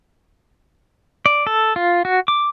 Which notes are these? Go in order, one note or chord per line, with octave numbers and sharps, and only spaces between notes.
D5
A4
F4
F#4
D6